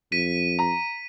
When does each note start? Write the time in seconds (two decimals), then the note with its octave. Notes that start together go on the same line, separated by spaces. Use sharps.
0.12 F2 B6 D#7
0.59 A#5